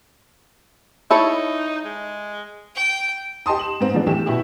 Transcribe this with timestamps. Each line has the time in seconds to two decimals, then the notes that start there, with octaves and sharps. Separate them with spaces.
1.11 D#4 E4 A4 C#5
1.85 G#3
2.76 G5
3.46 G4 D#5 A5 C6 D#6
3.59 E7 F#7
3.81 G#2 C4
3.94 E3 F3 G#3 B3 D4
4.07 A2 E3 A3 G4 E7
4.26 B2 B3 E4 G4